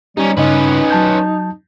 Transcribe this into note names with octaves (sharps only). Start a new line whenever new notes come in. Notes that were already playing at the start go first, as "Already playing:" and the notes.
G3 C#4 D#4 G4
G2 C#3 C#4 D#4 B4 D#5
F#3 A5 G6